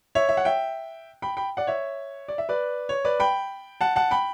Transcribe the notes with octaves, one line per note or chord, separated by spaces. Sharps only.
C#5 E5
E5
F#5
E5 G5
G5 B5
G5 B5
D5 F#5
C#5 E5
D5
E5
B4 D5
C#5
B4 D5
G5 B5
F#5 A5
F#5 A5
G5 B5